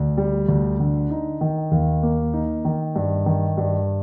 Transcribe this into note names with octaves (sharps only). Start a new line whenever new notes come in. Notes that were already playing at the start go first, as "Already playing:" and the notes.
Already playing: D2
G3
D2
D3
D#4
D#3
D#2
A#3
D#4
D#3
G2
D#3
G2